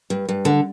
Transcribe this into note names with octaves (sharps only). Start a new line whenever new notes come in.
G2
G2
D3